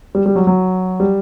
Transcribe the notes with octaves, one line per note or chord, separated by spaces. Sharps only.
G3
G3
F#3
F#3
G3